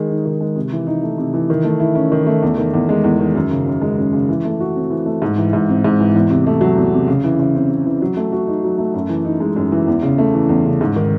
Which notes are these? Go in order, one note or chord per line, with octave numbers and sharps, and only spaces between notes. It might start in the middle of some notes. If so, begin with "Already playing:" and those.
Already playing: D#3 G#3 G#4
D#4
D#3
G#3
C3
E3
D#4
A3
C3
E3
D#3
A3
E4
C#4
D#3
A3
E2
D#3
E2
G#3
E2
D#3
F#2
C#3
F#2
G#3
F#2
C#3
E3
A3
F#4
C4
E3
A3
G#2
E3
G#2
C4
G#2
E3
E2
C3
A3
F#3
E2
C3
C#3
E3
C#3
C4
C#3
E3
F#3
A3
F#4
D#4
F#3
A3
F#2
E3
D#4
G#3
F#2
E3
E2
C#3
A3
E3
E2
C#3
G#2
D#3